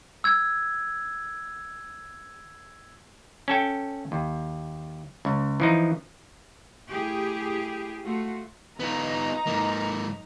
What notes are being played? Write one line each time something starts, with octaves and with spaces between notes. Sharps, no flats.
E6 G#6
C#4 A4 G5
D#2
C#2
E3 F3 D#4
A3 E4 G4 G#4
A3 F4 F#4
B3 D#4 F4 A#5
G#2 A#3